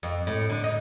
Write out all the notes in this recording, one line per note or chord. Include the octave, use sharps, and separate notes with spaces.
F2
A2
D3
D#4